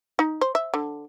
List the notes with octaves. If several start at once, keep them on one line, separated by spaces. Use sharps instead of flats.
D#4
C5
E5
D3